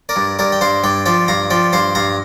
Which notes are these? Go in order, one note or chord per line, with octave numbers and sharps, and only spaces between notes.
A#4 D5
G2
G2 A#4 D5
G5
G2 C5 F5
G2 D5 G5
F3 D5 G5
G2 F5 A#5
F3 D5 G5
G2 C5 F5
G2 F5 A#5